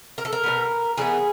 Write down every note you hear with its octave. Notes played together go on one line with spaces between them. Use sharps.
A#4
A4
A#4
B2 G3 B3
E3 G3 B3 G#4